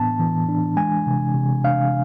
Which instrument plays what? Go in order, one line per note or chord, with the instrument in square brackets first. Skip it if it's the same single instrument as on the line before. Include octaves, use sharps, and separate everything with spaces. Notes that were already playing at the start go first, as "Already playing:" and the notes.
Already playing: [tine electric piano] A2 E3 B3 D4 A5
E3
D4
G#3 G#5
C3
C3
D4 F5